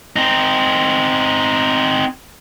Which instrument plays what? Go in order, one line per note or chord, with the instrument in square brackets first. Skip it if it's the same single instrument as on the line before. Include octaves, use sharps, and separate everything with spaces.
[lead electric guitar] C4 D#4